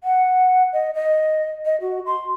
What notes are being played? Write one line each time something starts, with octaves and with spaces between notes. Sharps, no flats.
F#5
D#5
D#5
D#5
F#4
C6